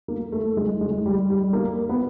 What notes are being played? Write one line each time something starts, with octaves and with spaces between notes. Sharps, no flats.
A#3
A3
G#3
G#3
G3
G3
A#3
B3